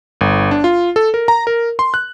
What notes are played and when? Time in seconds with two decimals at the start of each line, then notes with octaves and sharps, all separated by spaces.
0.21 G1
0.51 D4
0.64 F4
0.96 A4
1.14 A#4
1.28 A#5
1.47 A#4
1.79 C6
1.94 F#6